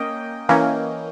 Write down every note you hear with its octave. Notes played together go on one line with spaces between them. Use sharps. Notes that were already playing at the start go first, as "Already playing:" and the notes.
Already playing: A#3 C#4 D#5 G5
E3 A#3 C#4